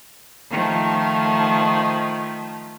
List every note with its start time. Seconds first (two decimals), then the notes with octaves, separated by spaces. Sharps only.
0.50 D#3 F3 A3